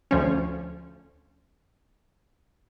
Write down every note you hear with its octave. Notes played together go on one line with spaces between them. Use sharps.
D2 F3 C#4